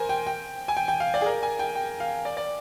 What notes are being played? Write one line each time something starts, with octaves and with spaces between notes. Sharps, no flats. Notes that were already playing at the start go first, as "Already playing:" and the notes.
Already playing: A#4 C5 G#5
G5
G5
G#5
G5
G5
F5
D5
G#4
A#4
G#5
G5
G5
F5
D5
D5